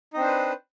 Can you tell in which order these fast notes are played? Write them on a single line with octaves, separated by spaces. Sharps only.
D#4 C4 D4 C5 B4